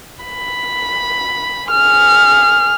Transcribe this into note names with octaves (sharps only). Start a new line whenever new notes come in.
B5
G#4 F6